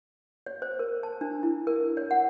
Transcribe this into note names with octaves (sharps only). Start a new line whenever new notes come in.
C#5
C5
A#4
A5
D4
E4
A#4
C#5
F#5